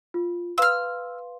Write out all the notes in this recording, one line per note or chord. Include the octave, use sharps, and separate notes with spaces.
F4
B4 F5 C6 E6 F6